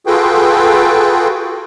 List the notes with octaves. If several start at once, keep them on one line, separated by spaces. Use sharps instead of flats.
F4 F#4 G#4 A4 B4 G5